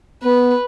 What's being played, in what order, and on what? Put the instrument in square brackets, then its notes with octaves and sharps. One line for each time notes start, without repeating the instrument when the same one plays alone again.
[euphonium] B3 [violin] B4